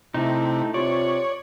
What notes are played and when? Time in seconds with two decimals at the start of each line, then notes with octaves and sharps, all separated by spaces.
0.14 C3 A3 D#4 E4
0.74 C3 F4 C#5 D5